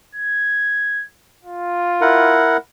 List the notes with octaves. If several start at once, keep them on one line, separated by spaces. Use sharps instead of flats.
G#6
F4
E4 A#4 F#5